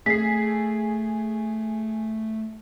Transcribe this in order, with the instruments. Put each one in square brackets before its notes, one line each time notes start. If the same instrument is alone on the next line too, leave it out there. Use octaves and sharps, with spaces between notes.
[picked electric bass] A3 [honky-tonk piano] G#4 [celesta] B6 C7